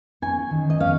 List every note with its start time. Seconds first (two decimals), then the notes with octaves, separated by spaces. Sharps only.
0.22 C#4 G#5
0.51 D#3
0.70 D#5
0.80 C#4 F5